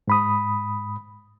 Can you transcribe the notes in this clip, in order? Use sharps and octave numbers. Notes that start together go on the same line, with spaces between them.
G#2 B5 D#6